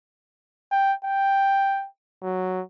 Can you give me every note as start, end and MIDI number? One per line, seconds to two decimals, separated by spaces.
0.72 0.93 79
1.04 1.87 79
2.23 2.61 54